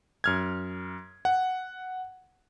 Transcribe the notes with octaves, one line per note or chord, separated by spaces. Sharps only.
F#2 F6 G#6
F#5